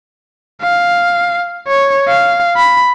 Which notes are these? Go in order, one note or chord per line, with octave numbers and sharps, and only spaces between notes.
F5
C#5
F5
B5